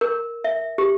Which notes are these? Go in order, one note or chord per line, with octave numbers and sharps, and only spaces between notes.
A#4
E5
G4